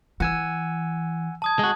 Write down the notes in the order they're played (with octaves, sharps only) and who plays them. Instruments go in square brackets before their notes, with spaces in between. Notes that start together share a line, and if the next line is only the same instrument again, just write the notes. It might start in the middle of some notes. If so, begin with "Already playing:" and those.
[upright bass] E3 [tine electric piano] F#5 G#5 E6
[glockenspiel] A5 D#6 G#6
[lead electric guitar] G#3 F#4